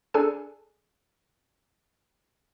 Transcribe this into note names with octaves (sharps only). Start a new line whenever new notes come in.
D4 G#4 A4 G#5